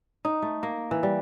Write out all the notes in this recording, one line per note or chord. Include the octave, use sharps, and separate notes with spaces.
D#4
A3
A#3
E3
G3